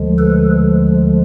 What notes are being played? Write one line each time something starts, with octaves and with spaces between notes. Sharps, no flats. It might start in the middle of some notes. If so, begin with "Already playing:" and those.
Already playing: D2 D3 F3 G#3
A4 B4